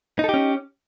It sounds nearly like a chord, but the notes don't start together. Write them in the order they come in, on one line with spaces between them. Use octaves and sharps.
D#4 A4 G4 C#4